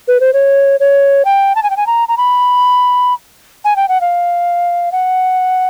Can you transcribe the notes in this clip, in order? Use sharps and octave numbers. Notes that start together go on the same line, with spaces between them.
B4
C5
C#5
C#5
G5
A5
G#5
G5
G#5
A#5
A#5
B5
G#5
G5
F#5
F5
F#5